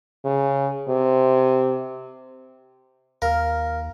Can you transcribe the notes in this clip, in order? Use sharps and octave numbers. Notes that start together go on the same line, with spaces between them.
C#3
C3
D#2 A#4 F5 F6